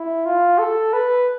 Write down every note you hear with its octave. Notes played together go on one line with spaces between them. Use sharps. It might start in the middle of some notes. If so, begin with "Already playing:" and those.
Already playing: E4
F4
A4
B4